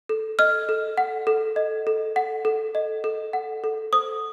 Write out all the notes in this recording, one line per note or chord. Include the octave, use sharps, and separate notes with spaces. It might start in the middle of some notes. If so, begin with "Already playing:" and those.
A4
D#5 F6
A4
F#5
A4
D#5
A4
F#5
A4
D#5
A4
F#5
A4
C5 D#6